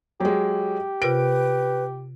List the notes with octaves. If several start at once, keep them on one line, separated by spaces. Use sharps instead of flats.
F#3 G#3 G4
C3 F4 A#4 B4 D7